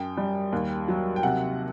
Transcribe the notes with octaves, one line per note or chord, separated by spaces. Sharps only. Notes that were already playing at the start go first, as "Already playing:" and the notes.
Already playing: F#2 G5
G3
D#2
F#3
G5
C3 F#5